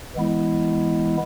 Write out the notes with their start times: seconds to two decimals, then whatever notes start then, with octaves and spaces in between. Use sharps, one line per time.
0.16 E3 G#3 B3 E4